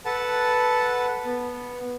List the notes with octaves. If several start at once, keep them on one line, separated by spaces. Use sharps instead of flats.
A4 B4 F#5 A5
B3